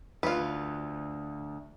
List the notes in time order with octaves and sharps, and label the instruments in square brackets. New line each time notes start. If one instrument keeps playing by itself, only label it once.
[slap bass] D2 [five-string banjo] F4 B4